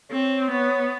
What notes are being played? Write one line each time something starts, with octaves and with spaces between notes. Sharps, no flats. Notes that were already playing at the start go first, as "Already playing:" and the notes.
C4 C#5
B3 C#5